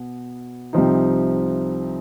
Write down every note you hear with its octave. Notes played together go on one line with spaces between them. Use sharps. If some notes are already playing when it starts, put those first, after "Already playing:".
Already playing: B2 B3
C2 C3 F3 C4 D#4